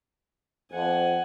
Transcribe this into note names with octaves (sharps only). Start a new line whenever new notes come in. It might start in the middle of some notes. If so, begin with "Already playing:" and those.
F2 F#5 G#5